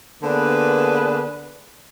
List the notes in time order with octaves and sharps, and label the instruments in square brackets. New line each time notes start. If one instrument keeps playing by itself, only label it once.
[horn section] D3 A#3 B3 D4 G#4 B4